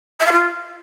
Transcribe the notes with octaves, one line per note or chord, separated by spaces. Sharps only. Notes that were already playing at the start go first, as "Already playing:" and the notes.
E5
F5
F4